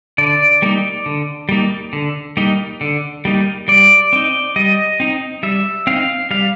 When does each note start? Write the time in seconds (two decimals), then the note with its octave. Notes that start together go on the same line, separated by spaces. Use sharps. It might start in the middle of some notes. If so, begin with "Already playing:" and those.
0.18 D3 D5
0.62 G3 A#3 D#4
1.06 D3
1.49 G3 A#3 D#4
1.93 D3
2.37 G3 A#3 D#4
2.81 D3
3.25 G3 A#3 D#4
3.68 G3 D5
4.13 C4 D#4
4.56 G3 D#5
5.00 C4 D#4
5.43 G3 E5
5.87 C4 D#4 F5
6.31 G3 F5